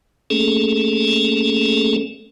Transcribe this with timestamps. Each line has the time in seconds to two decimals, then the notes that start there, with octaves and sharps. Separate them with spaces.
0.30 A3 A#3 C#4 G#4 A4